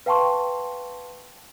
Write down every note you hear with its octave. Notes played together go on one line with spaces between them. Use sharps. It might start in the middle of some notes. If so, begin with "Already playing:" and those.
B4 F5 G5 A5 C6 C#6